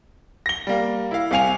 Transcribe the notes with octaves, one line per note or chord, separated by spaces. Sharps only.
A#6 G7
G3 A#3
E4 F5
C2 C4 F5 G#5 F7